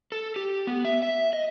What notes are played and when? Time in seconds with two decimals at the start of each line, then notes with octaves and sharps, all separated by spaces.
0.12 A4
0.36 G4
0.67 B3
0.85 E5
1.03 E5
1.33 D#5